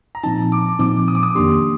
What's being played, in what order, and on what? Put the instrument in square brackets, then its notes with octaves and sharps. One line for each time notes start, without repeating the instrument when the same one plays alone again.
[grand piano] A#5
[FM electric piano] A#2 F3 C4 D#4 [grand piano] A5
[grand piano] D6
[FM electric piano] A#2 F3 C4 D#4 [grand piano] D6
[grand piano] D#6
D6
D#6
[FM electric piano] F2 D#3 A#3 D4 G4 [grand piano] C6